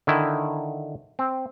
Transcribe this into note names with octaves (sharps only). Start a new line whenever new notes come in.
D3 D#3 E4
C4